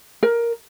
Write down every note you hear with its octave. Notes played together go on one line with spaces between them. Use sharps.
A#4